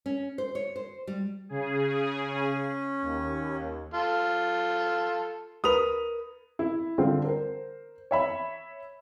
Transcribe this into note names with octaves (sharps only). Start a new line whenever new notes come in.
C#4
C5
C#5
C5
G3
C#3 G#4
C#4
D#2
F4 A4
A#4 B4 D#6 F7
E4
D3 G3 C4 F4
A#4 C5
C#5 E5 B5